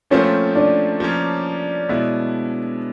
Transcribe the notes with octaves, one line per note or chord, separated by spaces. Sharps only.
A#2 F3 A3 C4 C#4 F4
D4
F3 A#3 C#4
B2 G#3 B3 E4